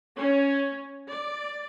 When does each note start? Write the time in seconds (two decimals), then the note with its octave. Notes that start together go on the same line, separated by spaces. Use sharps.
0.18 C#4
1.09 D5